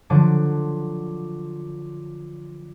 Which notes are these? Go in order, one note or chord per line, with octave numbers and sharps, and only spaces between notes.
D3 F3 F#3 D6